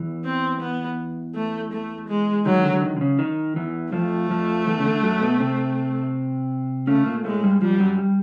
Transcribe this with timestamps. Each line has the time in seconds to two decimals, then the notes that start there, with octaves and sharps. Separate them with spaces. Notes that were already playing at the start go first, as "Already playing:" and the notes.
Already playing: E2 E3
0.25 C4
0.61 B3
1.35 A3
1.72 A3
2.08 G#3
2.46 D#3 F#3
2.63 D3
2.82 D#3
2.97 D3
3.01 C#3
3.19 D#3
3.56 E2 E3
3.93 F2 F3 A3
4.30 F2 F3
4.67 E2 E3
4.78 C#3
4.85 D3
5.03 F#2 F#3
5.21 B2 B3
5.40 C3 C4
6.87 C#3 A3 C#4
7.06 A#2 A#3
7.24 A2 G#3 A3
7.43 G2 G3
7.62 F2 F3 G3
7.80 F#2 F#3
7.98 G3